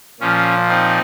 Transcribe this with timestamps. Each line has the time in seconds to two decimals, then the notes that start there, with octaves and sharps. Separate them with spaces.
0.20 A#2 F3 C#4
0.69 C4 D#4